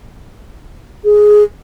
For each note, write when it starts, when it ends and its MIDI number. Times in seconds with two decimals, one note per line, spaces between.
1.04 1.43 68